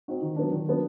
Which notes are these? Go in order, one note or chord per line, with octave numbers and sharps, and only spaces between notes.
C4 D#4 F#4
D#3
F#3 B3 D4
D#3
F#3 B3 D4